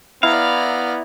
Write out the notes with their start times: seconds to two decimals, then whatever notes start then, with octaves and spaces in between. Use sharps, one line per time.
0.23 B3 E4 D5 F5 A#5